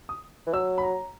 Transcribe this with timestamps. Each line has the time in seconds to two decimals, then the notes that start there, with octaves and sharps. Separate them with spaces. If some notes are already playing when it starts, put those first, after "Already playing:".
0.09 D#6
0.47 E3
0.54 F#3 E6
0.78 B5
0.83 A#5